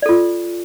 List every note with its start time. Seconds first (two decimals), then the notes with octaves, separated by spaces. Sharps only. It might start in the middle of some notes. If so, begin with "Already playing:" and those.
0.02 D5
0.06 A4
0.09 F4